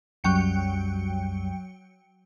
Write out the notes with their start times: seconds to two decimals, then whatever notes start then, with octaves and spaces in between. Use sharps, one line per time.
0.24 C2 F#2 F#3 G3 G5 C#7